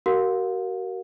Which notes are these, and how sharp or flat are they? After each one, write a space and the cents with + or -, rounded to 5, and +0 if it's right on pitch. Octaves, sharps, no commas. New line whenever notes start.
F#4 +40 A#4 +0 F5 +35